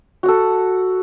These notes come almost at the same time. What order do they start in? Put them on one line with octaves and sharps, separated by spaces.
F#4 F#5 A4